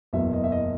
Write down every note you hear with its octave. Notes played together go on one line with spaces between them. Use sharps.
F#1 E2 B2 F#3 E5
D#5
E5
D#5